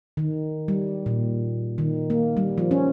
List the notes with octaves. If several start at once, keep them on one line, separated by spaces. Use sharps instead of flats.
D#3
G3
A#2
D#3
A#3
G3
F3
C#4